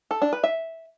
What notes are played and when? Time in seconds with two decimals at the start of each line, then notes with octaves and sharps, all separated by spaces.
0.11 A4
0.22 D4
0.33 B4
0.44 E5